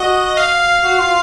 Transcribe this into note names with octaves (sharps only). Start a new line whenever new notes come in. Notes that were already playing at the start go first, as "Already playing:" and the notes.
Already playing: F#4 D#5
F5
F#4
F4